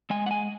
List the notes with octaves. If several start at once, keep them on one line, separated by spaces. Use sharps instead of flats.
G#3 G#5
F#5
G#5